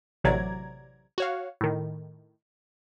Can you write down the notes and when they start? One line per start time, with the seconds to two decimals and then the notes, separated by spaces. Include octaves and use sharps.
0.24 A1 C3 F#3 D5 A#5 G#6
1.18 F#4 C#5 F5
1.61 A2 D#3